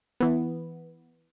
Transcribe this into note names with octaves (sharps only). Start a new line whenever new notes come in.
E3 B3